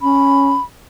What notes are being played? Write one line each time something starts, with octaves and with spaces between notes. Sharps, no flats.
C#4 B5